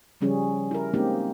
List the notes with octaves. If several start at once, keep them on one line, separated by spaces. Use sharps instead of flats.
C#3 F3 G3 C#4 G#4
E4 A#4
G#3 A#3 C4 C#4 D#4 G4